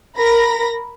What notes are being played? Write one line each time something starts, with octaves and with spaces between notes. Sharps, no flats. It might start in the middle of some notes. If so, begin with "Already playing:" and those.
A#4 B5 A#6